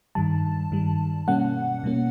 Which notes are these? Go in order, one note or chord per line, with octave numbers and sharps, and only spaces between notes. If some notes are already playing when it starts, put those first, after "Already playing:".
G2 D#3 G3 A5
G2 D#3 G3
B2 G3 A#3 C#4 F#5
B2 G3 A#3 C#4